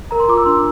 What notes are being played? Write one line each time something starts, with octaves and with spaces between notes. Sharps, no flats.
A#4 A#5
C6
F4 D6
E6
D4 C6